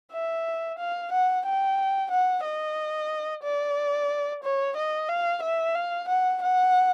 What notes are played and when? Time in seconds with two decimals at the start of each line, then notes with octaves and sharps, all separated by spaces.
0.12 E5
0.79 F5
1.12 F#5
1.46 G5
2.11 F#5
2.45 D#5
3.43 D5
4.43 C#5
4.76 D#5
5.09 F5
5.43 E5
5.75 F5
6.08 F#5
6.42 F#5